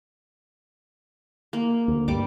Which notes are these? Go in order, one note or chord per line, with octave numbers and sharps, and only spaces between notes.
A#3
D2
G2 G3 D6